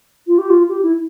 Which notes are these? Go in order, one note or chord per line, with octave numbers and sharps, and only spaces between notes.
F4
G4
F4
G4
E4